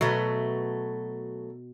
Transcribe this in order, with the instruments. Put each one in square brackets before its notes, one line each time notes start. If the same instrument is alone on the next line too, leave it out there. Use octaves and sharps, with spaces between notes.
[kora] B2 [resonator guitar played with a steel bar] F#3 A3 B3